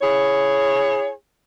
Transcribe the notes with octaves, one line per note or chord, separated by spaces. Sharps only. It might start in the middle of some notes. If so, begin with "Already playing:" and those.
E4 G#4 C#5